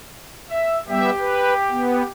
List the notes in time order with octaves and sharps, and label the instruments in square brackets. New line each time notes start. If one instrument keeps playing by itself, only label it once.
[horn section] E5
[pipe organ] G3 B3 E5 [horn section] G4
[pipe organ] B4
B3